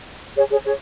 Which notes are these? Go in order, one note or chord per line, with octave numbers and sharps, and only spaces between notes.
G#4 C#5
G#4 C#5
G#4 C#5